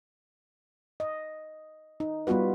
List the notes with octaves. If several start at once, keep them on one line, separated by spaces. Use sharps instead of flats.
D#5
D#4
G3 B3 F4 F#4 B4